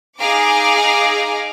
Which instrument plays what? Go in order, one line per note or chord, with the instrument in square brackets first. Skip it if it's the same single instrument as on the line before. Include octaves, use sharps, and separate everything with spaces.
[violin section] D#4 G#4 F5 A#5 D6